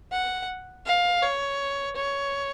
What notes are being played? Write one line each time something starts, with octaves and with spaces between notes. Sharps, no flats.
F#5
F5
C#5
C#5